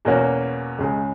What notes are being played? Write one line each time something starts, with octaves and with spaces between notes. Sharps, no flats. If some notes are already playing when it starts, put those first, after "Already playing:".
E2 B2 A#3 C#4 F#4
C#2 C#3 G#3